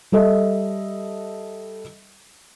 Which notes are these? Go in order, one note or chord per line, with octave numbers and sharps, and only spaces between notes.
G3 A4 D#5 E5